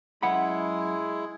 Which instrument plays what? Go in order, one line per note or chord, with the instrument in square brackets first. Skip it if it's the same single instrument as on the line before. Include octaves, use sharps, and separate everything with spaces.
[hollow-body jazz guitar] F#2 F#5 B5 [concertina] G#3 E4 G#4